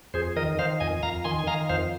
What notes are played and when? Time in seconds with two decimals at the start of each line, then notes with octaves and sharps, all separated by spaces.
0.14 F2 G#4 C5
0.36 D#3 A#4 D#5
0.59 D#3 C5 F5
0.80 F2 D#5 G#5
1.03 F2 F5 A#5
1.24 D#3 G#5 C6
1.39 G#5
1.47 D#3 F5 A#5
1.69 F2 C5 F5